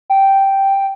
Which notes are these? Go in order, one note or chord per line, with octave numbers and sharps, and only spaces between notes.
G5